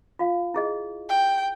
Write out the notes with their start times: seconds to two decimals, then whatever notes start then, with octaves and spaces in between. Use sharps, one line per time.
0.19 F4 F5
0.54 E4 G#4 D#5
1.09 G5